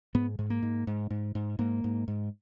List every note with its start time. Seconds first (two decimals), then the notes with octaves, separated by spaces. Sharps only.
0.15 G#2 B3
0.39 G#2
0.50 A#3
0.63 G#2
0.87 G#2
1.10 G#2
1.35 G#2
1.59 G#2 A#3
1.84 G#2
2.08 G#2